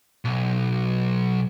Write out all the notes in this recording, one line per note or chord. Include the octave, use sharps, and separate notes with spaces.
B1